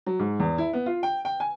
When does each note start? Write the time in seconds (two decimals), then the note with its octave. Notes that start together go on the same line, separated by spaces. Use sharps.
0.07 F#3
0.19 G#2
0.40 E2
0.58 E4
0.73 B3
0.86 F4
1.03 G5
1.25 G5
1.40 G#5